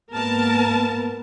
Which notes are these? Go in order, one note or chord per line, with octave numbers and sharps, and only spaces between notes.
G#2 A#3 B3 A#4 A5